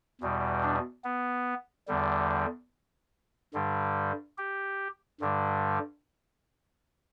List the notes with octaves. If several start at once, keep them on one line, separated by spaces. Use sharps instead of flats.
E2 B2 G3
D4
B3
E2 D3 G3
G2 D3 G3
G4
G2 D3 G3